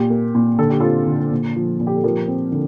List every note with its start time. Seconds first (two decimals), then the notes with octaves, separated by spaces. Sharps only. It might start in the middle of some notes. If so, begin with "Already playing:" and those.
Already playing: A#2 G4
0.10 A#3
0.35 A#2
0.58 D3 A4
0.70 G4
0.80 C4 F4 A4
1.07 D3
1.31 A#2
1.56 F3
1.80 A#2
1.87 G4
1.96 A4
2.04 F3 G4 A#4
2.28 C4
2.52 D3